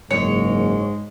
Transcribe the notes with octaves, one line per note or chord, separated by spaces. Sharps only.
F#1 G#2 G#3 C#5